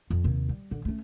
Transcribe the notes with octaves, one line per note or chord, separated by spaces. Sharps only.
F2
D#2 C3
G3
D3
A3 C#4